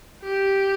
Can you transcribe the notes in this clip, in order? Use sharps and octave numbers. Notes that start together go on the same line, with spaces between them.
G4